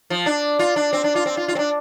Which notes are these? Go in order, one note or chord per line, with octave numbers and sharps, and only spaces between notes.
F3
D4
F4
D4
C4
D4
F4
C4
F4
F4
C4
D4